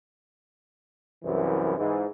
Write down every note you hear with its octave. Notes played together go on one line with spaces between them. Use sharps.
C2 F#2 E3
G#2 E3